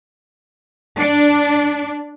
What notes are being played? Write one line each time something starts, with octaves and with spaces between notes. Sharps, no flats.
D4